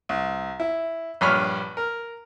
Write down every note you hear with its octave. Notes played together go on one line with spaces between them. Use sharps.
C2
E4
A#1 G2 C#5 B5 F6
A#4